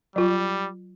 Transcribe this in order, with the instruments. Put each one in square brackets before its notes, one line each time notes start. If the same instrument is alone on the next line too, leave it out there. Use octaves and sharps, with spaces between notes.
[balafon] F#3 F4 [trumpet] G3